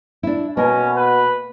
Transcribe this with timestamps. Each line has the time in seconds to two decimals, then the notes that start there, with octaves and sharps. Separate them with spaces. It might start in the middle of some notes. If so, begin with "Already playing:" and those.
0.23 D4 E4
0.57 B2 A#3 C#4 A#4
0.96 B4